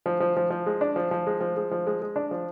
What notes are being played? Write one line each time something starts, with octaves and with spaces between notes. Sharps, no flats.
F3
F3
F3
F3
G#3
D4
F3
F3
G#3
F3
G#3
F3
G#3
G#3
D4
F3